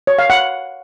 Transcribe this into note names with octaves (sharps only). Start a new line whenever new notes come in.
C#5
F5
F#5